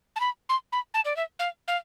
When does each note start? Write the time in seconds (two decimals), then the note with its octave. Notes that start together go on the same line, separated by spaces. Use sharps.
0.16 A5
0.20 B5
0.49 C6
0.72 B5
0.94 A5
1.05 D5
1.16 E5
1.39 F5
1.68 F5